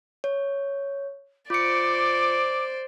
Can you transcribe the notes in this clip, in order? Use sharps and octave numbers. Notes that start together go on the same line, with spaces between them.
C#5
F4 C5 D5 D6 C#7